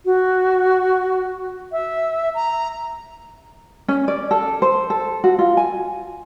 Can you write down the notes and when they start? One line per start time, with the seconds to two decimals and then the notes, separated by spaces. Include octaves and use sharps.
0.05 F#4
1.72 E5
2.35 A#5
3.88 C#4
4.08 D5
4.31 A4
4.62 C5
4.90 A4
5.24 F#4
5.39 F4
5.57 G#5